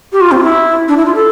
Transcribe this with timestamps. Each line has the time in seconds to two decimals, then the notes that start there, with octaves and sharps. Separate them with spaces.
0.12 G4
0.20 F4
0.31 C4
0.37 F4
0.43 E4
0.88 D4
0.97 E4
1.05 F4
1.14 A4